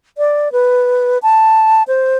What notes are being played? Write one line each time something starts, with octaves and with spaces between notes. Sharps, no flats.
D5
B4
A5
C5